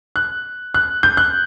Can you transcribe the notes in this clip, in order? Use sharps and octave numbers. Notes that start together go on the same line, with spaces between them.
F#6
F#6
G6
F#6